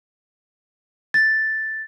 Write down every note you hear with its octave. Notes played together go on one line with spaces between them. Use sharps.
A6